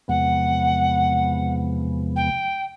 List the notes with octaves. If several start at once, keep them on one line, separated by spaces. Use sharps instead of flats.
E2 C3 F3 G#3 B3 F#5
G5